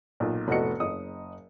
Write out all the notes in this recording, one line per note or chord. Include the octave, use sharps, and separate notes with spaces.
B1 A#2
F1 A2 B3 F#4 D#5 C#7
F#1 D#5 D#6